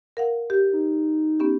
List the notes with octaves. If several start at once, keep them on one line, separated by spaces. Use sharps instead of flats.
A#4 F5 F#5
G4
D#4
B3 C#4 G4